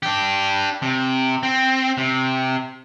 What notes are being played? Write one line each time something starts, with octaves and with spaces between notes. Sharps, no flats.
D4 G4
C3
C4
C3